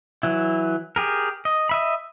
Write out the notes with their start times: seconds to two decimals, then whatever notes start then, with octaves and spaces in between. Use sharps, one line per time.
0.23 E3 F#3 E4
0.96 G4 G#4 A#4
1.45 D#5
1.69 D#5 E5 B5